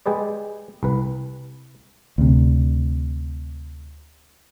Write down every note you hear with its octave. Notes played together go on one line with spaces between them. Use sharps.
G#3 G4 G#4 B4 D5
C2 B4
D2 C3